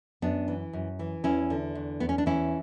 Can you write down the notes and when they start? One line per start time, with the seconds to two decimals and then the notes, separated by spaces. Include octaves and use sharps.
0.22 F#2 B3 D4
0.48 E3
0.73 F#2
0.99 E3
1.24 E2 C#4 E4
1.50 D3
1.75 E2
2.00 E2 B3
2.09 C#4
2.18 D4
2.26 E3 C#4 E4